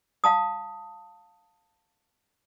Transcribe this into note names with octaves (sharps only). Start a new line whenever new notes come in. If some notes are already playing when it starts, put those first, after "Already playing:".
F5 A5 D#6